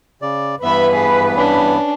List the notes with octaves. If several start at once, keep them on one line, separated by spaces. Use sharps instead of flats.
C#3 D5
G2 E3 B3 B4 E5 B5
G#4
C#4 D4